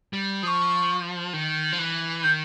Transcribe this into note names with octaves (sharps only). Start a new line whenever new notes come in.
G3
F3 C#6 D#6
D#3
F3
E3
D#3 G6